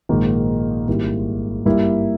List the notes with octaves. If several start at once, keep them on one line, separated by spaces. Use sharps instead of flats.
A#1 G#2 D#3 A#3 D#4
G#1 G#2 G3 A#3 E4
G2 G3 A#3 E4